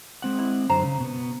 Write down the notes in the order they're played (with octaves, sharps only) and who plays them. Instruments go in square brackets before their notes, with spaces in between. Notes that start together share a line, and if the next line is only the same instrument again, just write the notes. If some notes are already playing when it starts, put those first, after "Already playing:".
[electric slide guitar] G#3 C4 F#5
[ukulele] E4
[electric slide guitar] F#2 D3 C5 [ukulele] A#5
[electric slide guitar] C#3
B2 B3